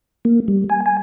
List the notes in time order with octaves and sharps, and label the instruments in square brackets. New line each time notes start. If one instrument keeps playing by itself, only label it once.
[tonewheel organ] A#3
G3
G#5
G#5